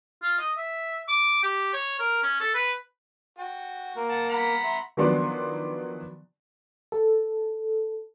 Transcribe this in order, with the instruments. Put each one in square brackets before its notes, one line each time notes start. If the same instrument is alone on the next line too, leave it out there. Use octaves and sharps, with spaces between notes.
[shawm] F4
D#5
E5
D6
G4
C#5
A#4
C#4
A4
B4
[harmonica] F#4 [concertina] G5
[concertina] A#3 A#4
[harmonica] F#5 A5
F#5 A#5 B5
[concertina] E5 C6
[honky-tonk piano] D#3 F3 F#3 B3 D4 C6
[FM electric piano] A4